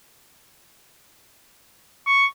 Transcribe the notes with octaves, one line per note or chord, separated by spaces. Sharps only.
C#6